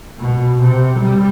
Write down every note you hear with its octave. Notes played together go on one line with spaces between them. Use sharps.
B2
C3
G3